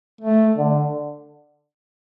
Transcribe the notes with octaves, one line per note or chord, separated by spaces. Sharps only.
A3
D3